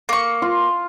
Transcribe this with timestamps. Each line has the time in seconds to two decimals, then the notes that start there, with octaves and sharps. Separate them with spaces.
0.09 A#3 C#6
0.42 F4